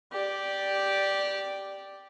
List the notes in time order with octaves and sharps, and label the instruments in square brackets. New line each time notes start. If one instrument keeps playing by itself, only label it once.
[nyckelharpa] G4 D5